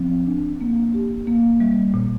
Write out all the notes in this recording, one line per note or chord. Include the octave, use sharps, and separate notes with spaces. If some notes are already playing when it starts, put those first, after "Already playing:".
Already playing: F3 C4
D4
A#3
G4
A#3
G3
A#2